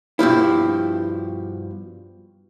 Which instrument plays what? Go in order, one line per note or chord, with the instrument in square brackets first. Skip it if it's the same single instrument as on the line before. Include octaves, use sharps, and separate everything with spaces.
[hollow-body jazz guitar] G2 B2 F3 E4